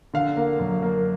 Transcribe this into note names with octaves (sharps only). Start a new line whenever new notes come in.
D3 F5
A#3
F#2
A#3